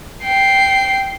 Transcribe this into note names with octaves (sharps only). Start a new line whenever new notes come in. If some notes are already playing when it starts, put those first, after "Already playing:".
G5 C7